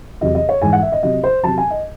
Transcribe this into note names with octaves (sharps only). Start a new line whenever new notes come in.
E2 C3 F#3 D#5
D#5
C#5
G#2 E3 G#3 G#5
F#5
E5
D#5
C3 F#3 D#5
C5
C3 F#3 A5
G#5
D#5